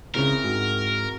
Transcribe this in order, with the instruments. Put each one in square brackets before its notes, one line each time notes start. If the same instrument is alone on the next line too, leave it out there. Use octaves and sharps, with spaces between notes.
[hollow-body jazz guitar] C#2 A2 C#3 [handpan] C4 E4 G#4 [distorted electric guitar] A#4
[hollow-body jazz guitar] G#2 [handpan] F#4